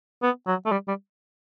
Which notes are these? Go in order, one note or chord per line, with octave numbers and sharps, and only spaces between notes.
B3
F#3
A3
G3
G3